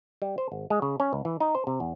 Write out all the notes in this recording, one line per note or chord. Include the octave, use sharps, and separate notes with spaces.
G3
C5
G#1
G#3
C#3
C#4
C#2
E3
D#4
C5
C3
E2